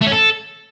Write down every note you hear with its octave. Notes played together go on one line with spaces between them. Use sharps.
A3
C#4
A4